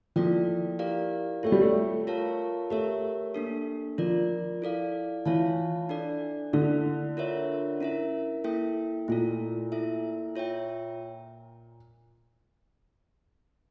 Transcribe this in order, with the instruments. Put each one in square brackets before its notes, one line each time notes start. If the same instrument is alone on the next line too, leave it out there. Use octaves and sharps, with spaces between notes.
[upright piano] F3 [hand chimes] A#3 E4 A4 D5 G5
[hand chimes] E4 G4 A#4 D5 F5
[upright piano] A3 [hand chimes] F4 C#5 G5
[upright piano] G3
A3
[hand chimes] F4 A#4 C#5 F5 A5
[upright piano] A3 [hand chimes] G4 A#4 C#5 E5
[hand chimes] A#3 D4 A4
[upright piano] F3 [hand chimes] F4 A#4 D5
[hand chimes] E4 A4 D5 F5
[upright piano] E3 [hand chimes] F4 C#5 F5 A5
[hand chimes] D4 A4 D5
[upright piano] D3 [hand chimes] A#3 E4 A4
[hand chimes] F4 A#4 C#5 E5
C#4 E4 A#4 E5
A#3 E4 A4 E5 G5
[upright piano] A#2 [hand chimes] A3 E4 A4
[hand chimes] E4 A4 E5
F4 C#5 E5 G5